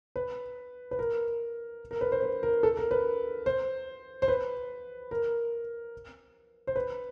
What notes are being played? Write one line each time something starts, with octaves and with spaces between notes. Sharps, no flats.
B4
B4
A#4
A#4
B4
C5
B4
A#4
A4
A#4
B4
C5
C5
B4
A#4
C5
B4